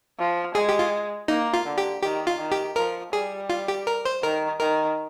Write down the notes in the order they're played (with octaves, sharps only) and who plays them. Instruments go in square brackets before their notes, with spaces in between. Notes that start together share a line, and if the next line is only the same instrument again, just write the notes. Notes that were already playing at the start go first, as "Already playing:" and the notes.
[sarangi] F3
[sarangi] G#3 [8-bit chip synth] G#4
[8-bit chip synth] G4
F4
[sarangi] A#3 [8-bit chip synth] D#4
[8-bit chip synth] F4
[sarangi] D3
[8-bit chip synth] G4
[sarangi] D#3 [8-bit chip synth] G4
[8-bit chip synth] F4
[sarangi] D#3
[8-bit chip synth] G4
[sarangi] F3 [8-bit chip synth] A#4
[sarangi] G3 [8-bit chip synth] G#4
[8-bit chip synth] F4
G4
A#4
C5
[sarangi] D#3 [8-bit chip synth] A#4
[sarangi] D#3 [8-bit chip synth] A#4